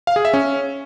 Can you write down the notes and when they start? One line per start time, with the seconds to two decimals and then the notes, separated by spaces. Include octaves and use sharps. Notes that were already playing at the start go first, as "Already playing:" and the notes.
0.07 F5
0.16 G#4
0.25 E5
0.33 C#4